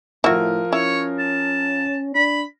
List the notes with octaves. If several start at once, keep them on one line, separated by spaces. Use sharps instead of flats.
A2 F3 E4 F#4 A#4
C#4 E4 C#5
A5
D4 B5